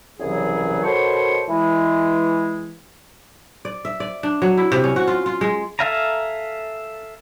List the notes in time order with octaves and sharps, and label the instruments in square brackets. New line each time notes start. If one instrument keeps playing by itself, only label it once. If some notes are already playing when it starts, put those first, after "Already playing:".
[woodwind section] C2 A#2 C#3 E3 F#3 G#4
B2 D#3 A4 C5 C#5 C#6
E3 G#3
[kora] D5
E5
D5
D4
F#3
E4
C3
C#4
F#4
F4
F4
G#3
[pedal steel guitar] A4 E5 F5 G#5 A#5